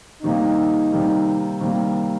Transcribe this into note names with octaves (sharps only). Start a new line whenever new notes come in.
C3 D#3 G3 A#3 D#4
C3 D#3 G3 A#3
C3 D#3 G3 A#3